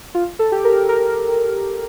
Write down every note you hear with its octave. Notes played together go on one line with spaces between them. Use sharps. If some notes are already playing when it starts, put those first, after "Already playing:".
F4
A4
G4
A#4
A#4